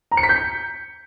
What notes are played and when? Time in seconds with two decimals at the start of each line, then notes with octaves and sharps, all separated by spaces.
0.12 A#5
0.17 C#7
0.23 B6
0.29 G6